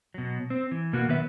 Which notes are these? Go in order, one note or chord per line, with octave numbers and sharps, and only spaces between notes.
B2 F#3
C4
E3
B2 A#3 B3 F#4
D#3 F#3 B3 B4 E5